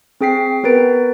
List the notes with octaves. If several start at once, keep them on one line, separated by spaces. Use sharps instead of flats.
C4 G#4 G5 B6 C7
B3 F#4 A#4 B4 A6 D7